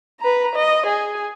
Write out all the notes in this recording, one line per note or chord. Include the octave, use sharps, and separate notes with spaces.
B4 A#5
D#5
G#4